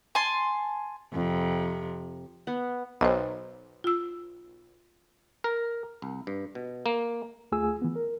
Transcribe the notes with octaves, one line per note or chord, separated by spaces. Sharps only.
G#5 A5 C6
F2 C3
B3
B1 C5 D#5
F4 E6
A#4
C2
G2
B2
A#3
D2 A3 F4 G#4 G#5 E6
E3 B3
A#4